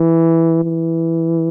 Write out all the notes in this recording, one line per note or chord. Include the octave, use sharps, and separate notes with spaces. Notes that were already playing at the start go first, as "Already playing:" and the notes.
Already playing: E3
E3